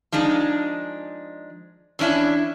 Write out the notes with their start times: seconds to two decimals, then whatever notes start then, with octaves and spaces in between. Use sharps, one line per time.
0.12 F3 G#3 D4 D#4
1.99 E3 C#4 D4 E4